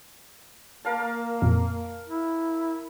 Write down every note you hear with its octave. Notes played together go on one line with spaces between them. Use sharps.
A#3 A#4 F5 A5
F2 A#2
E4